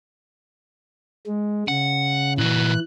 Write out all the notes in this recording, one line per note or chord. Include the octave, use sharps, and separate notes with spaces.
G#3
C#3 F#5
A#2 E3 F#4 F#6